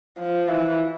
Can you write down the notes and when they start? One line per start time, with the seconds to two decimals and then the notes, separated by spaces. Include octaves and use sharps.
0.18 F3
0.48 E3